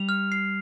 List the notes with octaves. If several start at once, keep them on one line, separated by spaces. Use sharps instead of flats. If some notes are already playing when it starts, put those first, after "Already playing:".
Already playing: G3 F7
F6
C7